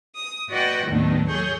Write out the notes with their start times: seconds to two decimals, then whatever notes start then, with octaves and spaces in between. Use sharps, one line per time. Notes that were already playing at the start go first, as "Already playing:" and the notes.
0.15 D#6
0.49 F#4 B4 D5 D#5 F#5 G5
0.86 D#2 A2 D#3 F#3 B3 D4
1.27 F#3 G#4 A4 C#5 G6